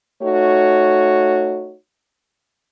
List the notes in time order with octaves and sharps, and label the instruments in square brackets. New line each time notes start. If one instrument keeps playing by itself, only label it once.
[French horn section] A3 D#4 F#4 C#5